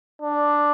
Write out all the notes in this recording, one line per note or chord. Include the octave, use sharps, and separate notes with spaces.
D4